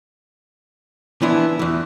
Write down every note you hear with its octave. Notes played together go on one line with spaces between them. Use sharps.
E3 F3 B3 D4 E4
E2 E3